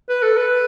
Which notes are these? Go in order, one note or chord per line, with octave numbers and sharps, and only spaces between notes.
B4
A4
B4